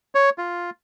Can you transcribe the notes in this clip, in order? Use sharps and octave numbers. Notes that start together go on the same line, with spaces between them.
C#5
F4